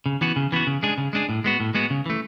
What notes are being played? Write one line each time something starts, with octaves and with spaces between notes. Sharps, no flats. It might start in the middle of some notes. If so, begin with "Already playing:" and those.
C#3
E3 B3 F#4
C#3
E3 B3 F#4
C#3
G#3 D4 G#4
C#3
G#3 D4 G#4
A2
G#3 B3 F#4
A2
G#3 B3 F#4
C#3
E3 A3